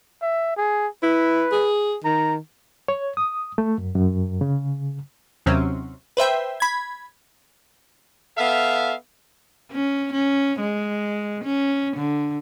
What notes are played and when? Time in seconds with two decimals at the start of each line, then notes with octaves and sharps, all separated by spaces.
0.22 E5
0.57 G#4
1.03 E4 B4
1.52 G#4
2.05 D#3 A#5
2.88 C#5
3.17 D#6
3.58 A3
3.78 F#2
3.95 F#2
4.41 C#3
5.46 D#2 C3 F#3 C4 C#4
6.17 B4 C5 E5 G5
6.60 B5 G#6
8.38 B3 A4 E5 F5
9.71 C#4
10.13 C#4
10.60 G#3
11.44 C#4
11.96 D3